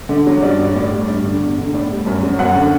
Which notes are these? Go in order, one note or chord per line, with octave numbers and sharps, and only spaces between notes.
D3
F#3
G2 D5
F#3
A2 D5
G3
G2
D3
E2
D3
A2 D5
G3
F#2
F#3
F#2 F#5
D3